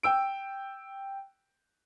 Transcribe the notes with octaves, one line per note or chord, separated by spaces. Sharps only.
G5 E6 D7